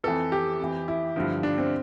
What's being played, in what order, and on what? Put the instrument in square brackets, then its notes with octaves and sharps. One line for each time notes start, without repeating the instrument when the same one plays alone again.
[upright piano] F2 E3 A4
G4
F2 E3
E4
G2 D3 F3
D4
C4